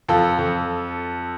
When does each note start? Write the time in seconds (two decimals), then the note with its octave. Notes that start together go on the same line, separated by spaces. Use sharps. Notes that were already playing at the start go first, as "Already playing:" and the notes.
0.08 F2 F4 A4
0.39 F2